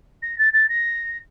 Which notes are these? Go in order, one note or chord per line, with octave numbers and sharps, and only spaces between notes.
A#6
A6
A6
A#6